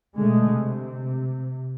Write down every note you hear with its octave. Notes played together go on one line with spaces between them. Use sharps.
B2 D3 G#3 A3
C3